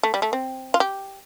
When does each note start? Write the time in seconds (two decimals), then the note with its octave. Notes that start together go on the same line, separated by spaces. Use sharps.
0.03 A3
0.14 G3
0.22 A3
0.33 C4
0.74 F4
0.80 G4